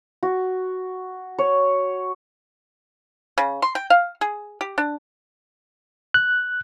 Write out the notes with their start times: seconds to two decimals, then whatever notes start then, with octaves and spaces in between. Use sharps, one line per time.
0.23 F#4
1.39 C#5
3.38 C#3
3.62 C6
3.75 G5
3.90 F5
4.21 G#4
4.61 G4
4.78 D4
6.14 F#6